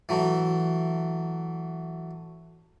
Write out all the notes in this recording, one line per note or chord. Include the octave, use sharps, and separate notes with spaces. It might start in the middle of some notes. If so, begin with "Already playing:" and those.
E3 F#3 A3